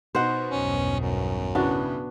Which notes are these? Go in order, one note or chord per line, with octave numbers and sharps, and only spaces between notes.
B2 D#4 C5 F#5
B1 E2 G2 C#4
F#2
A2 C#3 B3 D4 F#4